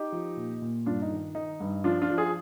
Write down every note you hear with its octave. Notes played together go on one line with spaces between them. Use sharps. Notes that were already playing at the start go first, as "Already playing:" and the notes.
Already playing: D#4 G4
F3
A#2
A#2
G2 D4 F4
D#4
D#3
D#3 D#4
G2
F3 D4 F4
D4 F4
F3
F4 G#4